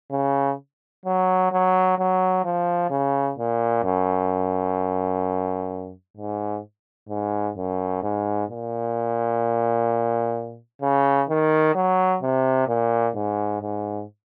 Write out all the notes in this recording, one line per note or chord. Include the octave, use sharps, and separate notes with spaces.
C#3
F#3
F#3
F#3
F3
C#3
A#2
F#2
G#2
G#2
F#2
G#2
A#2
C#3
D#3
F#3
C3
A#2
G#2
G#2